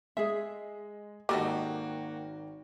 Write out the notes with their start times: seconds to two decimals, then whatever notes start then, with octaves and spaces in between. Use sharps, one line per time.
0.17 G#3 G#4 E5
1.29 G#1 A#3 F#4 G4 A4 D#5 G5